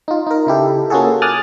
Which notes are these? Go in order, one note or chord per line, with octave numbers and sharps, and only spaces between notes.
D#4 F4
D#4 A#4
C#3 E4 G4 A4
A#3 C#4 F4 F#4 G#4 A4
G#5 D6 D#6 F6 F#6 A6